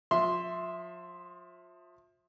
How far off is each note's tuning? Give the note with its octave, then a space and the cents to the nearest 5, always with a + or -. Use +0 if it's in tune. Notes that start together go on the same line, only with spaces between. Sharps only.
F3 +30 E5 +0 C6 +0